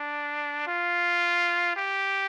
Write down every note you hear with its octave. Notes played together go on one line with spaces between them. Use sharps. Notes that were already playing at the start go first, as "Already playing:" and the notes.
Already playing: D4
F4
G4